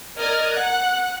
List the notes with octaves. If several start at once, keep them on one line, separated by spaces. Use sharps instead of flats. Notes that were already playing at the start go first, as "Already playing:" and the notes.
A#4 D5 D#5 A#5 F6 G#6
F#5 F#6